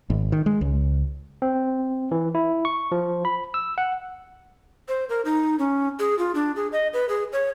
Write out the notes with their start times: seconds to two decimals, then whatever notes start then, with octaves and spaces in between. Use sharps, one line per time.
0.10 G#1
0.32 D#3
0.46 G#3
0.61 C#2
1.42 C4
2.11 E3
2.35 E4
2.65 C#6
2.92 F3
3.25 B5
3.54 E6
3.78 F#5
4.88 C5
5.09 A#4
5.25 D#4
5.59 C#4
5.99 G#4
6.19 F4
6.35 D4
6.56 G#4
6.72 D#5
6.93 B4
7.09 G#4
7.33 C#5